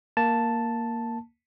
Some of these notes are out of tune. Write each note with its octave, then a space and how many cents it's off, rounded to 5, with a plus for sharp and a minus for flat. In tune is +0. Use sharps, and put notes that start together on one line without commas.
A#3 +0 A5 +0